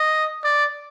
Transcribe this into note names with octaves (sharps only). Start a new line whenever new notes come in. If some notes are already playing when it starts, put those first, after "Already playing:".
Already playing: D#5
D5